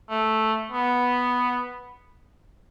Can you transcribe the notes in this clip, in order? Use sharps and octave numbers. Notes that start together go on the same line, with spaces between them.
A3
B3